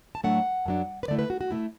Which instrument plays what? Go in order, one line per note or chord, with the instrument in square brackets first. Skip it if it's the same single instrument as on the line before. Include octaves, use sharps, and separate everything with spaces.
[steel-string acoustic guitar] A5
A2 F#3 A3 D4 F#5
F#2 F#3 D4
B4
D3 A3 E4 D5
B4
F#4
F#4
B2 A3 E4